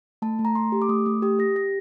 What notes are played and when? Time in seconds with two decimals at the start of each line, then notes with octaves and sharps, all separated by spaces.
0.22 A3 A5
0.39 A3
0.45 A#5
0.55 A3 C6
0.72 G4
0.82 D6
0.89 A3 D#6
1.06 A3 D#6
1.22 G4 D#6
1.39 G4 A#6
1.56 G4 A#6